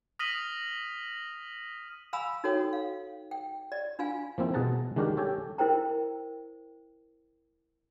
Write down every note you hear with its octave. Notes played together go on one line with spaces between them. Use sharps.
D#6 F6 A#6 B6 D#7 F#7
F5 G#5 A#5 B5 D#6 E6
D#4 F#4 A4 C#5 G5 D#6
F5
G5
D5 D#5
D4 F4 F5 G#5
F3 A#3 C4 E4
B2 G#4 F#5 A5 A#5
D#3 G#3 D4 F#4 G4 A#4
G4 A4 C#5 G5 G#5
E4 A#4 C5 G5 A#5